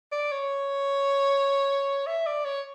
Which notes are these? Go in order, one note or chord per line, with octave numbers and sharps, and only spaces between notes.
D5
C#5
E5
D5
C#5